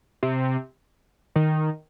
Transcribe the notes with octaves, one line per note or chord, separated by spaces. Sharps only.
C3
D#3